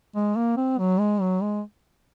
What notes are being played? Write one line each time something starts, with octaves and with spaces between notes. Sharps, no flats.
G#3
A#3
C4
F#3
G#3
F#3
G#3